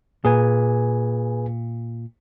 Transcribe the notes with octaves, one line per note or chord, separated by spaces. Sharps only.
A#2 G#4 B4 G#5